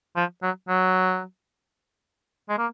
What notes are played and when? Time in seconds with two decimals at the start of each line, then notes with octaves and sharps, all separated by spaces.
0.17 F3
0.43 F#3
0.69 F#3
2.49 G#3
2.58 A#3